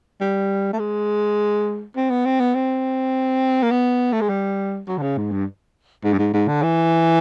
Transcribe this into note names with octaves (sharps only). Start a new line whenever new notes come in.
G3
A3
G#3
C4
B3
C4
B3
C4
A#3
B3
A3
G#3
G3
F#3
D3
C#3
G#2
G2
G#2
G2
G#2
G#2
D3
E3